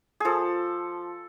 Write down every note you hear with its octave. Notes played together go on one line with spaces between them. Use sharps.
F3 G#4 A4